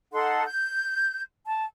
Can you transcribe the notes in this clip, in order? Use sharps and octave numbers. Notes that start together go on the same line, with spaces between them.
D#4 A4 F#5 C6
G6
A5